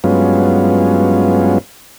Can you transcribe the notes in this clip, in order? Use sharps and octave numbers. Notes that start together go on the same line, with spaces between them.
G2 F#3 G#3 B3 C#4 F4